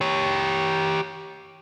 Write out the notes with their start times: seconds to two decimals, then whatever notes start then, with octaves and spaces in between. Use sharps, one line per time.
0.01 G4 C#5